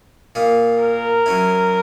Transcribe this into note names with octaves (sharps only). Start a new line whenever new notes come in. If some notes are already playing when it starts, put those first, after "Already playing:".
A#2 A#3 D#4
A#4
F#3 C#4 E4